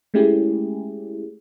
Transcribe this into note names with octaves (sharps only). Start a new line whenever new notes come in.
G#3 A3 C#4 E4 G4 G#4